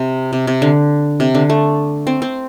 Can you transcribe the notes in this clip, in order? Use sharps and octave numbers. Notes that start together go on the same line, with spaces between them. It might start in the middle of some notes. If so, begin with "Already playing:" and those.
Already playing: C3
C3
C3
D3
C3
D3
A3
C4
C4